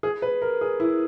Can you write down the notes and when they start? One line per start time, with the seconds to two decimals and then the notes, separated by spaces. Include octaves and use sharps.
0.03 G#4
0.22 B4
0.42 A#4
0.61 G#4
0.80 E4